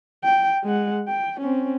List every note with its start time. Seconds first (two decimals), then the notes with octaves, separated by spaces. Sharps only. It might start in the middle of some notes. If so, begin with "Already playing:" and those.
0.24 G5
0.64 G#3 F#5
1.08 G5
1.40 C4 C#4